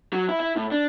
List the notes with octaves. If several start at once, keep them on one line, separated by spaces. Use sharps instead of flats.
F#3
E4
E4
A2
D4